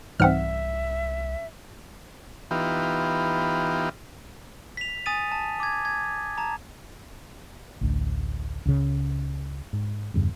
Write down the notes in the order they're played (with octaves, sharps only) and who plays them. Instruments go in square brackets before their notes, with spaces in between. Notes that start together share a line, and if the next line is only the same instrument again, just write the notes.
[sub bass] C2 [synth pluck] G#2 E3 G3 [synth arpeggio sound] C4 F#5 F6 [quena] E5
[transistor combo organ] E3 B3 D#4 F4 G4
[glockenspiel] B6 F7
G#5 D#6 A6 D#7
A5
D6 G#6
G#6
A5 A#5
[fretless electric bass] A1 D2
C#2 C#3
G#2
E2 G2 C#3